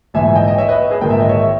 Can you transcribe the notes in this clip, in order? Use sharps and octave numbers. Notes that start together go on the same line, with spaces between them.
A#1 G#2 E3 E5 G#5
D#5 G5
D#5
C#5 E5
B4 D#5
G#4 B4
A#1 G#2 D#3 G5
E5
D#5
C#5 E5